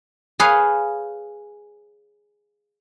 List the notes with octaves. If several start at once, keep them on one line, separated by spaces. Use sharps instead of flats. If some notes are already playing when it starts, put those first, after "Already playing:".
G#4 B4 C#5 F5